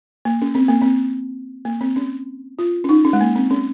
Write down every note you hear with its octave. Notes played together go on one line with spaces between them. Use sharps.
A#3
C#4
C4
A#3
C4
A#3
C4
C#4
F4
C#4
D#4
C#4
G#3
A#3
C4
C#4